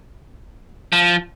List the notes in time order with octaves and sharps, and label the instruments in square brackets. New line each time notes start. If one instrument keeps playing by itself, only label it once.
[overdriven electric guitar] F3